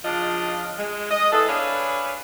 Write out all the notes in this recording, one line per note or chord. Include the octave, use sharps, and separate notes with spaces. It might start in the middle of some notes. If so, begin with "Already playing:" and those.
C#3 F3 D4 F4 D#5
G#3
D#5
B3 E4 G#4 A4
D4 G#4 B4 C#5 F5